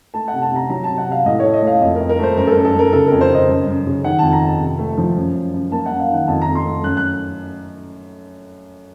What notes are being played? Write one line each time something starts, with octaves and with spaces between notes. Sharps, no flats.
A3 A5
F#5
C3
A5
C3 A#5
F#3 A#5
A5
C3
F#5
C3 F5
A2 D#5
A3 C#5
D#5
A3
F5
F2 D#5
A#4
F2
A#4
A3 C5
F#2 A#4
A4
F#2 A#4
A4
F#2 A#4
C#3 A4
F2 A#4
C5
C#3 D#5
F#2
F#2
C#3
D#3 F#5
F2 A5
A#5
F2 A5
C3
A3
F3
F#2
F#2
F#2
A#3 A5
F#2 F#5
F5
D#3 F#5
F2 A5
F2 A#5
C6
A3
F#2 F#6
F#6